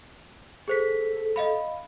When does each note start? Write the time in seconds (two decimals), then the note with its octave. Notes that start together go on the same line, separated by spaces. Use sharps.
0.68 G#4 A4 C5 B6
1.36 D#5 F5 B5